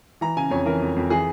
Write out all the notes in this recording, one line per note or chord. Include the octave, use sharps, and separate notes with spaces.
E3 A#5
C#3 G#5
F2 C#5
E3 A#4
F2
F2
E3 G#4